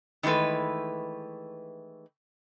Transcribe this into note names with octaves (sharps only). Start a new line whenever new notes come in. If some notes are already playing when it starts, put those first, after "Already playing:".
D#3 E3 G#3 A3 B4